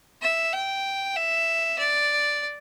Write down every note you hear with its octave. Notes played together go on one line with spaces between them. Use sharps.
E5
G5
E5
D5